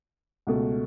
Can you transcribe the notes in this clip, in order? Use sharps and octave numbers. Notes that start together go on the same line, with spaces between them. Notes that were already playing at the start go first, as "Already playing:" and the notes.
C#2 B2 A3